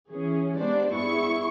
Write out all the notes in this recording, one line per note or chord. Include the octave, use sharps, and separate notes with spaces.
E3 C#4 G#4
G#3 B3 D4 G4 C5 D5
G2 B3 E4 G#4 C#6